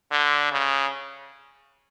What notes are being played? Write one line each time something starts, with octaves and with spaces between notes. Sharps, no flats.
D3
C#3